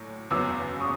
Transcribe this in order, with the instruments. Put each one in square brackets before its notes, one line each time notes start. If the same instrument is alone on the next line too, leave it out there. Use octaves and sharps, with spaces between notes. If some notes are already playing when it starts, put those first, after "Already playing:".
Already playing: [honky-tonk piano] A#1 A2 F#3
[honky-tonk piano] F#1 E2 C#3 F#3 B3 [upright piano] D6 E6
[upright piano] C#6 D#6